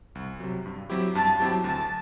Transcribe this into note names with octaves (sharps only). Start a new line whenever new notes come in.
C2
C3 F#3
G2
F#3 C4 E4 G4
G2 A5
F#3 C4 E4 G4
D2 A5